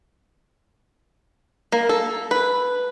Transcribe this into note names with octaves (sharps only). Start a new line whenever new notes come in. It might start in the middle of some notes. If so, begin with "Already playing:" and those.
A#3
A4
B4